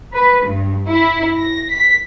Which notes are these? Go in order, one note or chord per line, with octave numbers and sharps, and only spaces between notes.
B4
G2
E4
A#6
B6